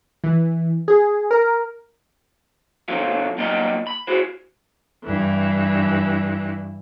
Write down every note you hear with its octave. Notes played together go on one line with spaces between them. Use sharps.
E3
G#4
A#4
B2 D3 F3 C#4 F4
F#3 G3 A#3 B3 F4 D#5
B5
F#4 G#4 C5
G2 E3